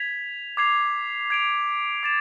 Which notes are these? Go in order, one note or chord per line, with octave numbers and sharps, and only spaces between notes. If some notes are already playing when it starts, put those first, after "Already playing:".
Already playing: G#6 B6 F7
D6 G#6 C7 F7
G#6 D7 F7
D6 A6 E7